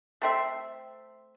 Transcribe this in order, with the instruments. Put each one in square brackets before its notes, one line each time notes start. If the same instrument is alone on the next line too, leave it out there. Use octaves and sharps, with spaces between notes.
[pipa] A3 C4 E5